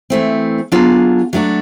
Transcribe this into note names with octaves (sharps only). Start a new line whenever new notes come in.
E3 A3 C4
F#3 B3 D4 F4 G#4
F#3 A3 D4 F#4